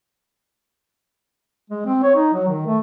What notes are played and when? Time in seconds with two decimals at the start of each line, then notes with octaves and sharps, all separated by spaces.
1.70 G#3
1.86 C4
2.03 C#5
2.15 D#4
2.33 F#3
2.48 D#3
2.66 A3